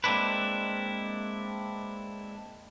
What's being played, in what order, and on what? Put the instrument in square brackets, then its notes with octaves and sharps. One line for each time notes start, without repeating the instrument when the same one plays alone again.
[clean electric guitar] G#3 A#3 C4 D4 E4 B4